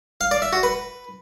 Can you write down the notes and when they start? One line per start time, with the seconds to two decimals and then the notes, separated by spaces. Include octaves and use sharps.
0.21 F5
0.31 D5
0.42 E5
0.53 F#4
0.63 B4